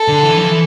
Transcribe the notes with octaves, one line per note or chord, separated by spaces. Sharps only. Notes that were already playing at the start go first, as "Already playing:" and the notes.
Already playing: A4
D3
E3
F3
E3